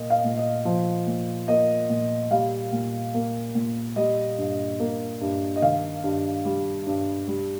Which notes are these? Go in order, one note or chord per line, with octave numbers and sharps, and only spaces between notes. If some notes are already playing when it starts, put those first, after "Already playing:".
Already playing: A#2 A#3 D#5
F5
A#2
D#5
F3
A#2
A#3 D#5
A#2
G3 F5
A#2
A#3
A#2
G3 D#5
G2
A#3
G2
D#5
D#3 F5
G2
G3
G2
G3